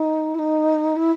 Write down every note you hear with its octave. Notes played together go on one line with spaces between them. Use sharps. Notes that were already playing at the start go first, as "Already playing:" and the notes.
Already playing: D#4
E4
D#4
E4